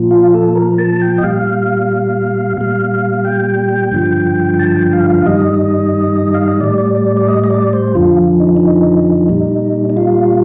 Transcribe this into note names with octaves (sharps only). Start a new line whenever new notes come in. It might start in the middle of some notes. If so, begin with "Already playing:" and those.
Already playing: A#2 F3
F4
A4
A#4
A5
G5
D#5
A#2 G3 F5
A#2 G3 F5
G5
G2 D3 F3
A5
G5
F5
F5
G2 D#3 G3 D#5
F5
D#5
A2 G3 D5
D5
D5
D5
D#5
D#5
D5
C5
F2 D3 F3 F4
D#4
D#4
A#2 G3
D#4
F4